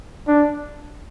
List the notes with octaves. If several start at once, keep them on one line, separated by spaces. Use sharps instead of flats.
D4